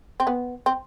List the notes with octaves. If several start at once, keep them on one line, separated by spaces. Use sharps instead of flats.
C4
B3
C4